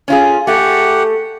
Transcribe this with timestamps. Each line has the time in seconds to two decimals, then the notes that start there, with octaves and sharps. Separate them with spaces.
0.08 C#4 F4 G#4
0.47 A3 G4 G#4 F#5